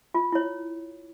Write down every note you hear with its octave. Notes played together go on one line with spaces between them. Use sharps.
F4
E4 C#5